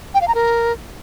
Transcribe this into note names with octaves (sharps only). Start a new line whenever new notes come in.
G5
F5
A#5
A#4